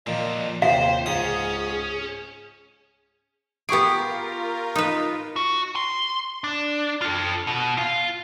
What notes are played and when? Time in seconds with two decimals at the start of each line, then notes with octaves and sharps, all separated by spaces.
0.07 A#2 D3 F3 D#5
0.62 D#2 C3 F4 C5 F5
1.06 C#2 G#2 C#4 G#4 D#6
3.69 B3 F4 G4 G#4 A#4 C#6 D7
4.75 D#4 B4
5.36 F#4
5.76 C6
6.44 D4
7.02 F4 A4
7.47 B2
7.78 F4 F5